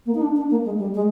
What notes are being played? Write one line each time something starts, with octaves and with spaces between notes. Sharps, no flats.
A#3
D#4
D4
D4
A#3
G#3
G3
G#3